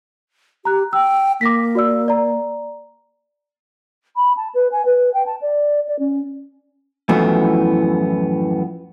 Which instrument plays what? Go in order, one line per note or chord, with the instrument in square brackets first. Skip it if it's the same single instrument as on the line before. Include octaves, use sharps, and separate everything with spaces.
[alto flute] G4 [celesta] A#5 F#6
[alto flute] G5 [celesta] E6
[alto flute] A#3 [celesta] D6 A#6 B6
[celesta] F#4 D5 E6
D5 A#5
[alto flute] B5
A5
B4
G#5
B4
G5
A5
D5
D5
C#4
[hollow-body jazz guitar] F#2 A2 E3 F3 A3 B3